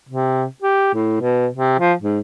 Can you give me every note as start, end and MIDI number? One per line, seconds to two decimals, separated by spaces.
0.09 0.45 48
0.62 0.92 67
0.94 1.16 45
1.21 1.47 47
1.55 1.78 48
1.79 1.93 53
2.02 2.19 44